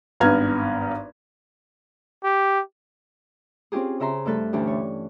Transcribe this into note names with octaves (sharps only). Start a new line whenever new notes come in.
G#1 G2 B3 A#5 F6 G#6
G4
C4 C#4 F4 G4 G#4
C#3 G#4 E5 A#5 C6
G2 A3 A4 B4
D2 D3 E3 C#4 D4 G4
C#5